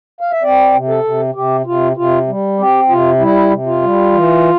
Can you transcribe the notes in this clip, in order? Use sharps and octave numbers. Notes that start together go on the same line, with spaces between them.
F5
E5
C4 D5
C3
A4
C3
C3 G4
C3 F4
C3 F4
G3
C4 G4
C3 F4
G3 E4
C3
F4
G3
E3